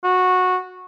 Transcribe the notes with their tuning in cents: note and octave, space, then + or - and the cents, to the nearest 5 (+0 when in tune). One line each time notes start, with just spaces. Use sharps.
F#4 -15